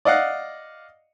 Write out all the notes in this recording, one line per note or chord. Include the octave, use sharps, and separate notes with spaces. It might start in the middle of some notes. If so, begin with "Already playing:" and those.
D5 D#5 F5 F#5